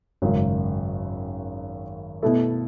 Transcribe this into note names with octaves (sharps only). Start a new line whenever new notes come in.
G#1 F#2 C#3 G#3
B2 A3 E4 A4